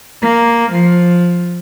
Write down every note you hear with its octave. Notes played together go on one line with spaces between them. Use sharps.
A#3
F3